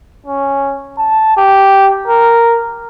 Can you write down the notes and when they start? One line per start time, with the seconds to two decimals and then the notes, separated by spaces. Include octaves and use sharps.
0.26 C#4
0.98 A5
1.37 G4
2.07 A#4